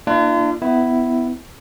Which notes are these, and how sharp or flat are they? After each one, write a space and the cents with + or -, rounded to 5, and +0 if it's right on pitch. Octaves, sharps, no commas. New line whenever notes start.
A#3 +0 D4 +30 F4 -40
B3 +20 E4 +0